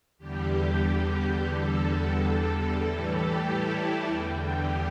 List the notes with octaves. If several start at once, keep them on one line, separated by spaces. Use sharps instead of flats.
E2 D3 G3 G4
E2 D3 G3 A4
A2 E3 G3 A4
G4
E4
E2 D3 G3
G4